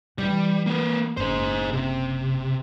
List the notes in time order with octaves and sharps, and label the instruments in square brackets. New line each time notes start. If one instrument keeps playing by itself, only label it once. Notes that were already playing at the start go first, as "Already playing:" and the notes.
[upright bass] E3 [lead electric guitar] G3
[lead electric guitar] A#3 B4
[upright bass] F#1 [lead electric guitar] G#4 C5
[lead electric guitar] C3